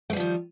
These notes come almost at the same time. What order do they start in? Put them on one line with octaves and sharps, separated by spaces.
A3 G3 F3 D#3